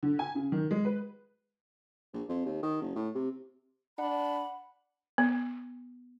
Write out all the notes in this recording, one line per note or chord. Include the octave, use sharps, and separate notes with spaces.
D3
G#5
C#3
D#3
G#3
B4
A#1
F2
D#2
D#3
F#1
A2
C3
D4 F#5 B5
B3